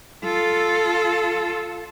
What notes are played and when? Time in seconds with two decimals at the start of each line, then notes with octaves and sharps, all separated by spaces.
0.24 F4 A4